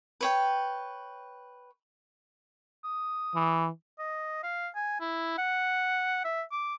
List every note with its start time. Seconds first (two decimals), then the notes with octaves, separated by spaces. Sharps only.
0.21 B4 C#5 G5
2.84 D#6
3.35 E3
3.99 D#5
4.43 F5
4.75 G#5
5.00 E4
5.38 F#5
6.24 E5
6.52 D6